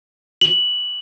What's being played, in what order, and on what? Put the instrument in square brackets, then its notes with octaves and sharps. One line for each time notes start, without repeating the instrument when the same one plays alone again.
[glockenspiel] F#7